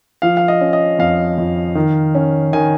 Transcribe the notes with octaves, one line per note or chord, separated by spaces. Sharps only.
F3 F5
F5
D#5
C#4
D#5
F2 F5
F2
D#3
C#4
D#3 G#5